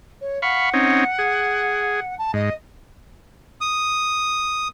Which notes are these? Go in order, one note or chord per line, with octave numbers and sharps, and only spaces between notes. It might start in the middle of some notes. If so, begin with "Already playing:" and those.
C#5
F5 F#5 B5 C#6
C4 C#4 D#4
G#4
A5
G#2 D#5
D#6